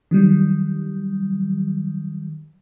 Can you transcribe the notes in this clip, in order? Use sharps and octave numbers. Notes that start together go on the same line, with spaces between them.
D#3 F#3 G3